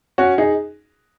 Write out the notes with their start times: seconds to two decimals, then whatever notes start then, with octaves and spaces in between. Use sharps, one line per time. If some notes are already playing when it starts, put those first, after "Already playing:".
0.18 C#4 F#4
0.38 D#4 G#4